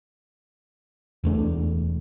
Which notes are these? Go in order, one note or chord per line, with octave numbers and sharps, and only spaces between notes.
E1 E2 A3 D4